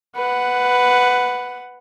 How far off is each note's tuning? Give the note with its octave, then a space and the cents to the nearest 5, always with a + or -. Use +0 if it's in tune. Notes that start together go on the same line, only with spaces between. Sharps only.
B4 +10 F#5 +0